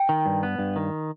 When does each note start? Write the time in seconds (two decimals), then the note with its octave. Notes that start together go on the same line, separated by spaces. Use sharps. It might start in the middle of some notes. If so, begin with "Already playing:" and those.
Already playing: G5
0.09 D#3
0.26 G2
0.43 B3
0.59 G2
0.76 D#3